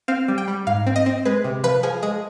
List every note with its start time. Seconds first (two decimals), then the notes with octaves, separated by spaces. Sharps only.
0.08 C4 F5
0.28 G3
0.38 G5
0.48 G3
0.67 G#2 F5
0.87 C4
0.96 D#5
1.06 C4
1.25 G#3 B4
1.44 C3
1.64 F3 B4
1.83 F3 G#4
2.02 G#3 G#4